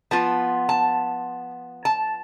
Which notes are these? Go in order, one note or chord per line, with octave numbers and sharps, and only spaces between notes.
F3 B3 F4 A5
A5
A5